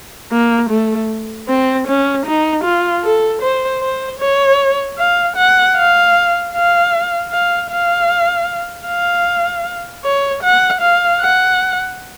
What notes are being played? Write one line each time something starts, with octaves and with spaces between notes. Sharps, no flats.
A#3
A3
C4
C#4
D#4
F4
A4
C5
C5
C#5
F5
F#5
F5
F5
F5
F5
F5
C#5
F#5
F5
F#5